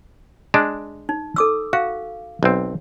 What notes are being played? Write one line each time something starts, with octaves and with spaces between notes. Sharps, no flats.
G#3 D4
D#4
A4 D6 E6
F#4 F5
B1 C4